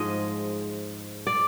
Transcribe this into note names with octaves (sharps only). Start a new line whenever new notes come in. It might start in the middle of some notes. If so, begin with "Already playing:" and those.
Already playing: G#2 F3 G#3 D#5
D5